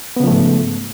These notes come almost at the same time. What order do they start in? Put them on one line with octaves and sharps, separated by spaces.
B3 C#3 F3 A3 G#2